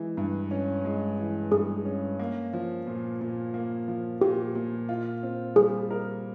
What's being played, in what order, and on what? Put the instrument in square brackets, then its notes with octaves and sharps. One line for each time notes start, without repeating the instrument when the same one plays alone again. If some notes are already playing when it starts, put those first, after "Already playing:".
Already playing: [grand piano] E3 G#3
G2
C#4
G#3
E3
[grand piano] G2 [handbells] G#4
[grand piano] C#4
A#3
F3
A#2
A#2
A#3
F3
[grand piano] A#2 [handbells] G4
[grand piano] A#2
F4
C4
[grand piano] G3 [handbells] G#4
[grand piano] A#4